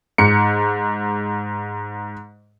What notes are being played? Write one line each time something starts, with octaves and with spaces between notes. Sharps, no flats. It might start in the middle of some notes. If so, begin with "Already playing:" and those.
G#2 C#7